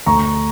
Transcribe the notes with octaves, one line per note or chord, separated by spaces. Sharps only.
D2 A#5 C#6